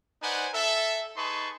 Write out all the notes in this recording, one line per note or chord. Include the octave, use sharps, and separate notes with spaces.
D#4 B4 C5 D5 F#5 G#5
A4 E5
D#4 G#4 B4 A5 C6 C#6